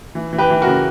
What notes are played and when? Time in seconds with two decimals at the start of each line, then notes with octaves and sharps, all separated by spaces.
0.15 E3
0.33 E3
0.38 G4 B4
0.50 E3
0.62 F#4 A#4
0.67 C#3